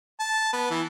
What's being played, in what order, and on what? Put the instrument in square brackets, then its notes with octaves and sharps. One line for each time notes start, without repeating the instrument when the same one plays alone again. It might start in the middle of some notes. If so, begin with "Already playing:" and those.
[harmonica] A5
B3
E3